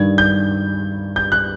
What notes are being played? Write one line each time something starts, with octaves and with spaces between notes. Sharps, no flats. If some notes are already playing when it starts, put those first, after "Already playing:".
Already playing: G2 D#3 G3 G#6
G6
G6
F#6